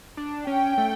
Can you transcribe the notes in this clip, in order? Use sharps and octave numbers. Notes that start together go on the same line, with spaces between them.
D4
C#4 G5
A3